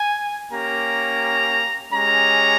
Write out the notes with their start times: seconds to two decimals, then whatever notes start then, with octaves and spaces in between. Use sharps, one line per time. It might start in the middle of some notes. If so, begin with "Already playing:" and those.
Already playing: G#5
0.52 A#3 C#4 G4 A#5
1.92 G#3 C#4 G4 A#5